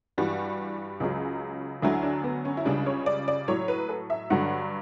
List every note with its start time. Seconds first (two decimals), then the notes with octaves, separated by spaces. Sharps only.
0.18 G2 E3 G3 F#4
1.00 C#2 C#3 F#3
1.82 D2 D3 F#3 E4
2.03 D4
2.24 B3
2.45 C#4
2.57 E4
2.65 C#2 C#3 G3 D4
2.86 C#5
3.06 D5
3.28 D5
3.48 A2 F#3 C#5
3.68 B4
3.89 A4
4.10 E5
4.30 G2 D3 F#3 F#5